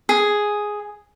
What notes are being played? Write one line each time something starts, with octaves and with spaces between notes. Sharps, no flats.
G#4